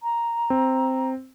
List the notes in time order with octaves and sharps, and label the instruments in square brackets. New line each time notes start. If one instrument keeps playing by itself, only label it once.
[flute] A#5
[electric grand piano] C4